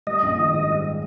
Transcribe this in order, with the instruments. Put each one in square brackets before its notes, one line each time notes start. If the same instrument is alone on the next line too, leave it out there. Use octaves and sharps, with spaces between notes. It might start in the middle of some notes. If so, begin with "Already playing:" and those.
[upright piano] G3 [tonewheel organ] D#5
[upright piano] A#1
D#3
G#2
G3